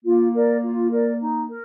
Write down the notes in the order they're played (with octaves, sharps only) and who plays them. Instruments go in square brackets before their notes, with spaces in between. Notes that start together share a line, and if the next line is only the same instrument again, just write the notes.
[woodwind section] A#3 [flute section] F4
[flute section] A#4 D5
F4
A#4 D5
D#4
A#4